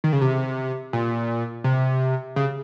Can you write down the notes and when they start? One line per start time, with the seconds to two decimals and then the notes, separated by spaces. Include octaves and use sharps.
0.04 D#3
0.13 C#3
0.21 C3
0.93 A#2
1.64 C3
2.36 C#3